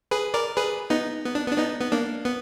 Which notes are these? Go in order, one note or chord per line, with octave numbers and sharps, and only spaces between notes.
G#4 B4
A#4 D5
G#4 B4
B3 D#4
B3
D4
B3
D4
B3 D#4
B3
A#3 D4
B3